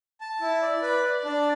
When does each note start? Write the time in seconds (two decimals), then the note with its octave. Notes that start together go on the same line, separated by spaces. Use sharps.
0.21 A5
0.41 E4
0.62 D5
0.82 B4
1.03 D5
1.24 D4